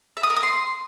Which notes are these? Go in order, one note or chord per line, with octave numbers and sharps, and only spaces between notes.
E5
D#6
A#4
D#6
C6